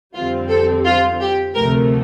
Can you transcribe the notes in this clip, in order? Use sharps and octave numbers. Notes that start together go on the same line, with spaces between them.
F2 D3 G3 C4 F4
A4
F4
G4
D2 C3 F3 A3 A#4